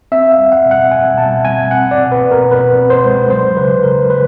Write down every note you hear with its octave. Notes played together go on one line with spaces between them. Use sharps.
C4 E5
F5
G3
F#5
B2
F#5
G3 G#5
B2 A5
C4 G#5
C4 F#5
D5
B2
B4
B2
A#4
B2 B4
C4
C5
G#3
F#3 C5
C#3 B4
C#3 A#4
C#3 B4